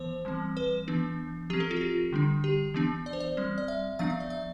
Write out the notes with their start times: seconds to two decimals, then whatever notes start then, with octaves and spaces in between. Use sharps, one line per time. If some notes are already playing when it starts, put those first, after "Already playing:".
Already playing: E3 B3 C5
0.25 E3 G3 C4
0.57 B4
0.88 E3 B3 D4
1.50 F3 G4
1.53 C4
1.60 A4
1.71 F4
1.77 G4
1.81 F4
2.12 D3 G3 D4
2.44 G4
2.74 E3 B3 D4
3.06 D5
3.13 C5
3.20 D5
3.37 G3 C4
3.58 D5
3.68 E5
3.99 F3 B3 D4 F5
4.10 E5
4.20 D5
4.30 E5